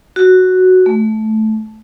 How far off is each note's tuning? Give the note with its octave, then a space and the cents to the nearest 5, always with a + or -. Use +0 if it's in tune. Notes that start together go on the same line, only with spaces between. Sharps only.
F#4 +0
A3 -15